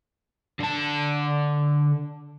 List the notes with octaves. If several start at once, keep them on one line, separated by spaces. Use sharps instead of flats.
D3 A5